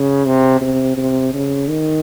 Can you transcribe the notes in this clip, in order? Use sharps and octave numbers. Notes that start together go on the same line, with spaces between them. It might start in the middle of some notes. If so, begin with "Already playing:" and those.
Already playing: C#3
C3
C3
C3
C#3
D#3